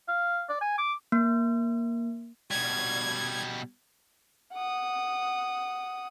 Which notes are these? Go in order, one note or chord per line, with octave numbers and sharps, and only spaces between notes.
F5
D5
G#5
D6
A#3
B2 G3 G#6
F#5 D#6